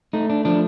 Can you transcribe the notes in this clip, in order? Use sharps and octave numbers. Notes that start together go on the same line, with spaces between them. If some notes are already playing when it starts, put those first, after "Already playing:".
A3 D#4
D4
F3 D4